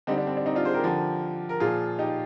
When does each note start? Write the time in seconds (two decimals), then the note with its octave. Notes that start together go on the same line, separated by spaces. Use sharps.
0.07 D3 G3 C4 D#4
0.18 D4
0.27 C4
0.37 D4
0.46 C4 D#4
0.55 D4 F4
0.65 G#4 C5
0.74 G4 A#4
0.84 D3 F3
1.49 A#4
1.60 A#2 F3 F4 G#4
1.99 D#4 G4